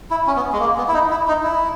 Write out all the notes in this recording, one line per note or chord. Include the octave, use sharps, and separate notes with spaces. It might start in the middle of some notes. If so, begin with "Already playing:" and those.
E4
C#4
B3
G#3
A#3
B3
E4
D#4
E4
D#4
E4